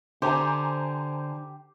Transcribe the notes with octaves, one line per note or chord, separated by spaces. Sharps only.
D3 G4 C5 G#5 A#5